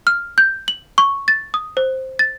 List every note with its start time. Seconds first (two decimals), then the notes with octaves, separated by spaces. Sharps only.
0.07 F6
0.38 G6
0.68 F#7
0.98 C#6
1.28 A6
1.54 D#6
1.77 C5
2.19 A6